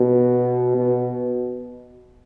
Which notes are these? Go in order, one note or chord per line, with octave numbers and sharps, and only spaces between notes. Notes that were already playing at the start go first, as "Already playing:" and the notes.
Already playing: B2
B2